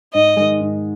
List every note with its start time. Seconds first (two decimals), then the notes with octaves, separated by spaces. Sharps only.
0.13 G#2 D#5
0.37 D#3 G#3
0.61 G#2